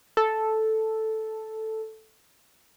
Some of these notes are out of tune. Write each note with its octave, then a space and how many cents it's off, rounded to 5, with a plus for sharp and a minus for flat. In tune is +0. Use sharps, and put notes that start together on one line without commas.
A4 -5